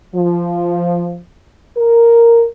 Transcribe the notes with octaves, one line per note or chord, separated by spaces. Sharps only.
F3
A#4